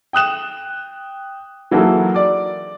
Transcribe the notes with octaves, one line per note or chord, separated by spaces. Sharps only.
G5 D#6 F#6 E7
E3 F#3 A#3 E4 G#4 A4
D5 D6